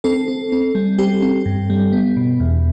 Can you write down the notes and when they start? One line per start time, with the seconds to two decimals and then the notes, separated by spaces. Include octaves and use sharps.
0.04 C4 A4
0.28 C4
0.52 C4
0.75 G3
0.98 C4 G4
1.22 C4
1.46 G2
1.70 G3
1.93 B3
2.17 B2
2.40 E2